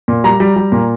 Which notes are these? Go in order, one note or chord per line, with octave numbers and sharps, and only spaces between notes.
A#2
G3 A#5
G3
G3
A#2